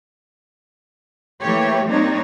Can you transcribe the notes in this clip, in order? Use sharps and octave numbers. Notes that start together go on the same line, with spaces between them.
E3 A3 A#3 G4 C#5
G3 A#3 C4 D4 D#4 C#5